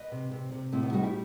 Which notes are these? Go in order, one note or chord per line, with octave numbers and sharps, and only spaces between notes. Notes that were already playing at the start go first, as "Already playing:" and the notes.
Already playing: B4 D#5
C3
C3
C3
A2 C4 E4
B3 D#4
G3 D#4 F#4
E4 G4